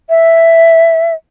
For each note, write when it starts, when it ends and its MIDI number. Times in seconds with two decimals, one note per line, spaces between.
0.09 1.14 76